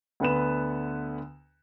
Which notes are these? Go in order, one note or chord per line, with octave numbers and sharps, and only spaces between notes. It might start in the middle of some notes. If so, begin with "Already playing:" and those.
D2 D3 B3 B4 E7